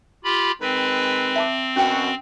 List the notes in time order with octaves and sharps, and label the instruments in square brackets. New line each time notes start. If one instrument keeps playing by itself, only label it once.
[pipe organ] F4 G4 B5
[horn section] D#3 G#3 B4 [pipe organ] C4
[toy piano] E5 A5 D6
[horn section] F#2 B2 F#4 [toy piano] C#4 G5